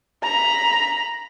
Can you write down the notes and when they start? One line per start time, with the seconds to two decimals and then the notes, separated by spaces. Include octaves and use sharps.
0.23 A#5 B5